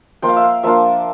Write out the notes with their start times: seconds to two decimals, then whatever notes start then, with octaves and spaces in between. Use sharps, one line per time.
0.22 F3 A#3 F4 G5
0.29 F5
0.36 E5
0.43 F5
0.63 F3 A#3 D4 F4 E5